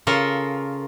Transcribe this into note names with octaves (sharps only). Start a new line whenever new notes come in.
C#3 F4 A4 A#4